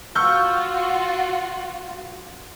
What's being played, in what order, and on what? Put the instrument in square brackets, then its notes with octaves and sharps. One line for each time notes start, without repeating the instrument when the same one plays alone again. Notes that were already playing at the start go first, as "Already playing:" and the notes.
[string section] F4 F#4 [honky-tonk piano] C#6 G6 [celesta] E6 F6